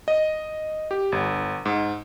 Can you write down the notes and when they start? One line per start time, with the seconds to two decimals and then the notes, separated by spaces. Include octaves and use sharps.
0.08 D#5
0.91 G4
1.12 G1
1.66 G#2